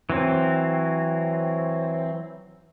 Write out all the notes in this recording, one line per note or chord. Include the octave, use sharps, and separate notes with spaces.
E3 F#3 C4